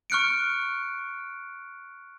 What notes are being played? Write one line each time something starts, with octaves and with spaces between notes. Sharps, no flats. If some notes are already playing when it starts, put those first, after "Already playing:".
C#6 F6 F#6 C#7 D7